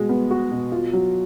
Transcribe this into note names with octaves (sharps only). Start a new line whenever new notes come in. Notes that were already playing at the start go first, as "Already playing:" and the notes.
Already playing: B2 G#3 F#4
B3
F#4
B2
F4
F#3